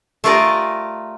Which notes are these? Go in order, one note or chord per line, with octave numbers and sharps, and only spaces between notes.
A3 F4 G4 A#4 D5 D#5